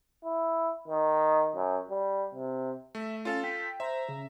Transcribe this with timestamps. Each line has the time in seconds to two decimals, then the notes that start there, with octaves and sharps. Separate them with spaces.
0.25 E4
0.89 D#3
1.56 F#2
1.91 G3
2.35 C3
2.95 A3 E5
3.25 C#4 F4 A4 F5 A6
3.44 G5 B6
3.80 C5 E5 A#5
4.09 C#3